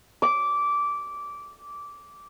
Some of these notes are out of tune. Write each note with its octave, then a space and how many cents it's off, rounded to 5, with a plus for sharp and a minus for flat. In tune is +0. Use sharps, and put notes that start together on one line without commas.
D6 -15